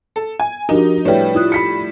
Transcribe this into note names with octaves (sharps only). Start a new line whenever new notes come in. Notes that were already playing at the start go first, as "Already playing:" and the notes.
A4
G#5
F3 D4 D#4 F#4 G4 A#4
A2 G3 B4 C#5 D5 E5 G5
E4 F4 D#6 F#6
B5 B6 C#7